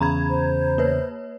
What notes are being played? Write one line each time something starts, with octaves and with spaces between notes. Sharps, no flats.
E2 C#3 A#5 B5 G#6
C5
A#3 B4 C#5